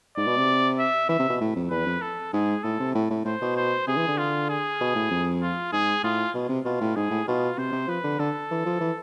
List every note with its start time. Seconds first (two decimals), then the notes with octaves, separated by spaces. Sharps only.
0.17 G#2 D5
0.27 B2
0.37 C3
0.79 E5
1.09 E3 E5
1.19 C3
1.30 B2
1.41 A2
1.56 F2
1.70 E2 B4
1.86 F2
2.01 A4
2.33 G#2 G#4
2.63 A2 A4
2.80 C3
2.95 A2
3.10 A2
3.25 A2 C5
3.41 B2
3.56 C5
3.87 C3 G#4
3.97 E3
4.07 D3
4.18 F4
4.49 G#4
4.80 B2
4.95 A2
5.11 F2
5.42 F4
5.72 G#2 G#4
6.03 A2 F4
6.34 B2
6.49 C3
6.65 B2 F4
6.81 A2
6.95 G#2 G#4
7.11 A2
7.27 B2 F4
7.58 C3 C5
7.72 C3
7.88 F3 B4
8.04 D3
8.19 D3 A4
8.51 E3
8.66 F3
8.81 E3